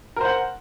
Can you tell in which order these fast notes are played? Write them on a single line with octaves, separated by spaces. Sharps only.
A#4 C5 F#5